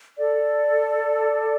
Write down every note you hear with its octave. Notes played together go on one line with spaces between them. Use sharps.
A4 D5